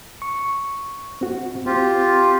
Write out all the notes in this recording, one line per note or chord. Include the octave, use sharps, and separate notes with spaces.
C#6
C4 F#4
C4 F4 G4